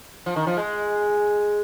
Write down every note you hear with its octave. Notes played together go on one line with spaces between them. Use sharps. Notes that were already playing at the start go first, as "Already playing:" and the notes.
F3
D#3
F3
G#3